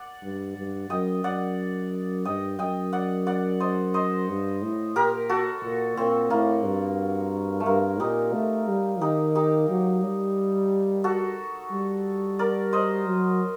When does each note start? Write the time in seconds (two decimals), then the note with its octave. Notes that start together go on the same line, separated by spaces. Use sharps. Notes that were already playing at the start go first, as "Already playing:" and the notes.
Already playing: D5 F#5
0.23 G2
0.56 G2
0.90 F#2 D#5 G5
1.24 F#2 D5 F#5
2.25 G2 D#5 G5
2.59 F#2 D#5 G5
2.93 D5 F#5
3.27 D5 F#5
3.60 C5 D#5
3.94 C5 D#5
4.28 G2
4.62 A2
4.95 A#2 G4 A#4
5.29 F#4 A4
5.63 A#2
5.97 A#2 C4
6.30 A2 A#3
6.65 G2
7.60 A3
7.66 G2 A#3
8.00 A#2 D#4 G4
8.33 A3
8.68 G3
9.01 D#3 D#4 G4
9.35 D#4 G4
9.69 F#3
10.03 G3
11.04 F#4 A4
11.71 G3
12.39 A#4 D5
12.73 C5 D#5
13.06 F#3